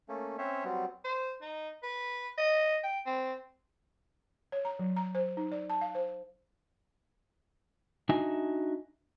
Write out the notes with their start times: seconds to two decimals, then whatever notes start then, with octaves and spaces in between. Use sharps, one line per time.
0.09 A3 A#3 C#4
0.38 C4 C#4 C5 C#5 E5
0.64 F#3 G3 B3 C4
1.05 C5
1.42 D#4
1.83 B4
2.38 D#5
2.84 G5
3.06 C4
4.52 C#5
4.65 A#5
4.79 F#3
4.96 A#5
5.15 C5
5.37 D#4
5.52 D5
5.70 A5
5.81 F5
5.95 C5
8.09 D4 D#4 F#4 D#5 E5 G#5